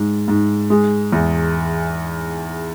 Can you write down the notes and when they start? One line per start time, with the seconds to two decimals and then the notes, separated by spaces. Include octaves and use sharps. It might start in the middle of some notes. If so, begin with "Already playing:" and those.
Already playing: G#2
0.28 G#2
0.70 G#3
1.12 E2